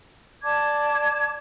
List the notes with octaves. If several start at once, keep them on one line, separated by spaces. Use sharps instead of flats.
D5 A5 D6 G#6